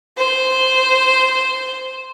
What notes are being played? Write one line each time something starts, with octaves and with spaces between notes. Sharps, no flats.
C5